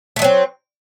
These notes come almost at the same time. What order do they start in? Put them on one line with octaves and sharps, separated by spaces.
A3 D#3 F#3 C4